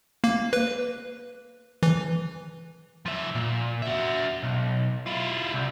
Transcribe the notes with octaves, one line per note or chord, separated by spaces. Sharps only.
A#3
B4
E3
F3 E5
A#2
F#4 E5
B1
E4 F4
C2